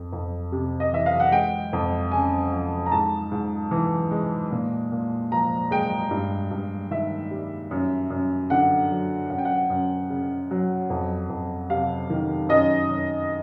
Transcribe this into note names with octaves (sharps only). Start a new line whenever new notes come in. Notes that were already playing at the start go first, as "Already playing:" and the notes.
Already playing: F2
F2
C3
D#5
E3 E5
F5
F#5
G#3 G5
F2
C#3 G#5
F3
A#5
G#2 A5
G#2
E3
G#3
A#2
A#2
F3 A#5
G#3 G5
G2
G2
D#3 E5
G3
F#2
F#2
D3 F#5
F#3
F#2 F#5
G5
F#5
F#2
C#3
F#3
F2
F2
C3 F5
D#3
F#2 D#5
F#2